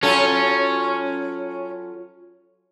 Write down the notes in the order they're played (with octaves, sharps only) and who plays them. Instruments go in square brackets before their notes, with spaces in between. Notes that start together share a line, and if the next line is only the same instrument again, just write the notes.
[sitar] F#3 F4 A4 [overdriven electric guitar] C#4